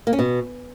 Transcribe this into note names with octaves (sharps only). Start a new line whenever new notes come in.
A#3
C#4
B2